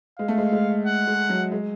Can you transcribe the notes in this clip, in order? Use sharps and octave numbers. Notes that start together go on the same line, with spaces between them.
G#3 F5
A3
G#3
G#3
F#5
G#3
F#3
G#3